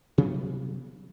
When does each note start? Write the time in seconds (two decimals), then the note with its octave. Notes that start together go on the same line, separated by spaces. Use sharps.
0.18 C3 F#3 G3 B3